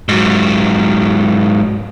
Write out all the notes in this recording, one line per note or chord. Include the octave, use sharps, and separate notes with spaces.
G#2 F#3